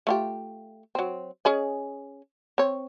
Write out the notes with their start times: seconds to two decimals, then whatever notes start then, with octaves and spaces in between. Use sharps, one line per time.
0.07 A3 F4 G4
0.95 F#3 C4
1.45 C#4 G#4 D#5
2.58 C4 C#5